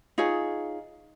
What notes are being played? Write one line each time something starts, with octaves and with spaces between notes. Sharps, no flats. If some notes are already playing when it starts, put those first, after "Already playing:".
D#4 F4 G#4 C#5